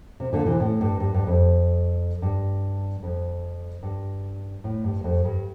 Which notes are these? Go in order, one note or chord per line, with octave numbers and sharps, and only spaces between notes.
C3
A#2 D3
C3 E3
A2
G2
G2
G2
F2
G2
F2
G2
A2
G2
F2
G2